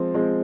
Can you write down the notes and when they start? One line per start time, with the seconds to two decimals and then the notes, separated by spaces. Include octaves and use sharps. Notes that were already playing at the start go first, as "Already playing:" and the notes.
Already playing: F3 G#3 C4
0.14 F3 G#3 C4